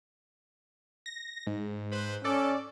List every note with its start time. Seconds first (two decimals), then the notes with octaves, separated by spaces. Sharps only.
1.06 A#6
1.47 G#2
1.92 B4 C5
2.25 C#4 A4 D5